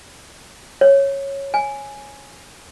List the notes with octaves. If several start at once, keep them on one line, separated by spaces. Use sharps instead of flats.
C#5
G#5